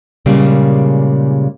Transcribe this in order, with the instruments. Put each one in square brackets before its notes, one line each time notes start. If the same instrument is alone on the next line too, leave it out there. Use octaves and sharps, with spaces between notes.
[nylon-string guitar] A#2 C#3 G3 G#3 A#3